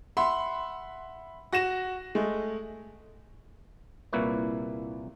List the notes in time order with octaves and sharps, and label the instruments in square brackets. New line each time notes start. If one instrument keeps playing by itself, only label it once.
[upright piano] E5 F#5 B5 C6
F#4 A#6 E7
G#3 A3
[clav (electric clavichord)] C2 A#2 A#3 E4 B4 C#5